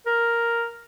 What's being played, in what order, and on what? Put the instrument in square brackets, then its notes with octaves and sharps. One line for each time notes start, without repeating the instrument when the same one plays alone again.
[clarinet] A#4